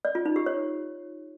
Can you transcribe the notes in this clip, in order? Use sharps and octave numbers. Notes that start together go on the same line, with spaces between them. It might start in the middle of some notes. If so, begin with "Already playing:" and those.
D5
F4
D#4
G4
C#5